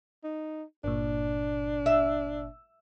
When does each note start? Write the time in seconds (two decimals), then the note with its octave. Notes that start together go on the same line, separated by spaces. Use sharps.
0.24 D#4
0.84 G1 A#2 D4
1.86 E5